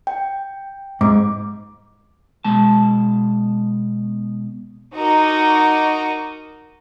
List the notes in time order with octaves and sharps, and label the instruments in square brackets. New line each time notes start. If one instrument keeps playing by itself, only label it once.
[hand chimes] G5
[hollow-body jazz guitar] G#2 [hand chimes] D6
[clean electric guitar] B2 G#3 A5
[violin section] D#4 F#4 A#4 D#5 C#6 D6